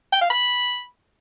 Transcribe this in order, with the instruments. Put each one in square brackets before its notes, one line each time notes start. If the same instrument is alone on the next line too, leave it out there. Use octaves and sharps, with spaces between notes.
[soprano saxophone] G5
F5
B5